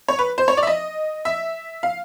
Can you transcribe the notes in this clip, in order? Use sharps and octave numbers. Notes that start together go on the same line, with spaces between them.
C#5
B4
C5
C#5
D5
E5
D#5
E5
F5